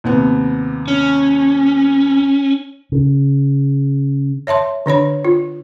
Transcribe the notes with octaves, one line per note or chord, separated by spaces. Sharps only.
D#2 C3 B3
C#4
C#3
C#5 E5 A5 C6
D3 D4 C#5 B5
F4